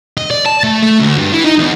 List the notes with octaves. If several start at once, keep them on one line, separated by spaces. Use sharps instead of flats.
D#5
D5
A5
A3
A3
D2
G2
E3
D#4
E2